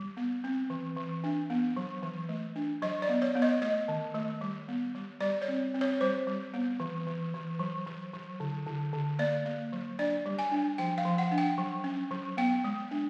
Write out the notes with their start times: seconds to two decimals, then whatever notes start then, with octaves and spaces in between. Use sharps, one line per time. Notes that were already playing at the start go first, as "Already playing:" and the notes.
Already playing: G3
0.17 B3
0.44 C4
0.70 E3
0.97 E3
1.24 D4
1.50 B3
1.77 F#3
2.03 E3
2.29 A3
2.56 D4
2.82 F#3 D#5
3.02 D5
3.09 B3
3.22 C#5
3.35 B3
3.42 D#5
3.62 A3 D#5
3.88 D#3
4.14 A3
4.41 G3
4.68 B3
4.95 G3
5.21 G3 D5
5.42 C#5
5.48 C4
5.74 C4
5.81 C#5
6.01 G3 C5
6.27 G3
6.54 B3
6.80 E3
7.07 E3
7.34 E3
7.59 F#3
7.87 F#3
8.14 F#3
8.40 D3
8.66 D3
8.93 D3
9.19 A#3 D5
9.45 A#3
9.73 F#3
9.99 D4 D5
10.26 G3
10.39 G#5
10.52 D4
10.78 F3 G5
10.98 F5
11.05 F3
11.18 F#5
11.31 D4
11.38 G5
11.58 F#3
11.84 C#4
12.11 F#3
12.37 B3 G5
12.64 G#3
12.91 D4